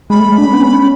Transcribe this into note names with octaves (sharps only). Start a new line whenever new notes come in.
G#3 B5
A3
G#3
D4
C#4
B3
C#4